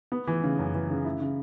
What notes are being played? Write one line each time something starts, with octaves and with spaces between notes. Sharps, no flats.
B3
E3
C#3
F#2
E3
C#3
E4
C#3